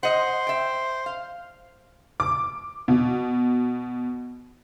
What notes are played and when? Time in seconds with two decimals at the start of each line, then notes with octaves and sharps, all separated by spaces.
0.03 C5 D#5 F#5
0.47 E5 G5
1.06 F5
2.20 D6
2.88 B2